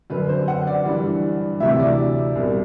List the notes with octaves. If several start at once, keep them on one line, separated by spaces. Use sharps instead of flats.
F#2 D3 B4
C5
F#5
D5
G2 E3
D2 C3 E3 E5
D5
C2 B2